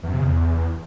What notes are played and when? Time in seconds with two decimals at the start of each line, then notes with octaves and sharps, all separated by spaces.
0.03 E2
0.08 F#2
0.14 C3
0.19 C#3
0.24 E2